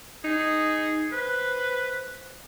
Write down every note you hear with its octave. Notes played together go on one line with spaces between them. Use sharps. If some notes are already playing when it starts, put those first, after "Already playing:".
D#4 G#4
B4 C5